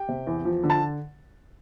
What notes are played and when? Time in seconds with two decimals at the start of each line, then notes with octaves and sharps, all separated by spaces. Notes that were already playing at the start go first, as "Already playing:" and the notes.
Already playing: G4 G5
0.08 C3
0.27 E2
0.45 F3
0.63 D3
0.70 A5